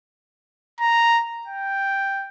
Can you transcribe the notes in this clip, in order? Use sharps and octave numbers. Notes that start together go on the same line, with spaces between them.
A#5
G5